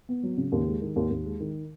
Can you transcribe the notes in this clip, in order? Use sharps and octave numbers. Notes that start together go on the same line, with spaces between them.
B3
F#3
C#3
D#2
G#3
D#3
D#2
D#2
G#3
D#3